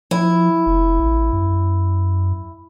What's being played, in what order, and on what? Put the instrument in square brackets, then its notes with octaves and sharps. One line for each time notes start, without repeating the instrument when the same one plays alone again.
[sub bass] F3 [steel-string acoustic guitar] E4
[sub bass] F1
A1
F#2